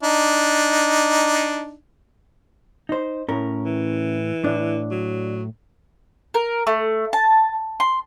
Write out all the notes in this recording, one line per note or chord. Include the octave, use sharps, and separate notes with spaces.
D4 D#4
D#4 C5
A2 C#4 A#4
E3
A2 D4
F#3
A#4
A3
A5
C6